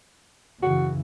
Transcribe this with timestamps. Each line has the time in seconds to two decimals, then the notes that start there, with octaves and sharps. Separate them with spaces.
0.62 F#2 C#3 E3 F#4